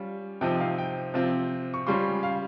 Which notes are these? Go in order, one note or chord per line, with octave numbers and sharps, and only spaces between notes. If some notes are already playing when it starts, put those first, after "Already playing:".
Already playing: G3 C#4 F4
C3 F3 C4 D#4 G5
F5
G5
C3 F3 C4 F4
C#6
C#3 G3 C#4 F4 C6
F5